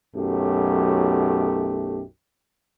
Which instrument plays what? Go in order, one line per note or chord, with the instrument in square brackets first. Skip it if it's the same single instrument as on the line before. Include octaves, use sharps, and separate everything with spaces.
[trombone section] B1 F#2 A3 G4